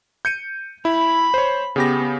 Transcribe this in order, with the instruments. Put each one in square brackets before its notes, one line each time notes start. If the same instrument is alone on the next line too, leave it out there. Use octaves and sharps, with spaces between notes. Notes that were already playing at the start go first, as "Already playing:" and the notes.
[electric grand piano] G6 C#7 D#7
[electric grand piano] E4 [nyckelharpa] B5
[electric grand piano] C5 C#5
[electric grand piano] C#3 G4 A#6 [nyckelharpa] B3